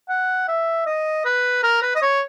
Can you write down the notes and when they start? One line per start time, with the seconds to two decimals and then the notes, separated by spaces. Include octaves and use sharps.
0.09 F#5
0.48 E5
0.86 D#5
1.25 B4
1.63 A#4
1.82 B4
1.95 D#5
2.02 C#5